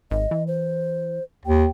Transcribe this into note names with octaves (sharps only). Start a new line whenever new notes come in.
G#1 D#5
E3
C5
D#2 G5